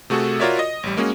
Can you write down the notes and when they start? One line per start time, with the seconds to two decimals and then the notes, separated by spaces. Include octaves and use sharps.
0.10 C3 A3 F#4 G#4 A4
0.40 F4 F#4 A#4 C#5 D5 E5
0.59 D#5
0.83 A1 G3
0.97 G#3 A#3 C#4 F#4 G#4